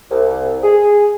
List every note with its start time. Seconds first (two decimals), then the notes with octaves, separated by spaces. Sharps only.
0.11 C2
0.63 G#4